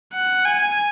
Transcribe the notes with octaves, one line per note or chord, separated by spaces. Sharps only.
F#5
G#5